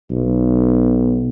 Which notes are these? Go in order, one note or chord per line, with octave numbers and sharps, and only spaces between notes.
B1